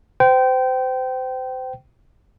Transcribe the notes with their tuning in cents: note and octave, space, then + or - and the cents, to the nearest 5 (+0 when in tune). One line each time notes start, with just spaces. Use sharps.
C5 -30 G5 -25